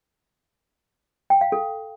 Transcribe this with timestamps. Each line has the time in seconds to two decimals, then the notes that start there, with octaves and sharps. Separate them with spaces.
1.30 G5
1.41 F5
1.52 A4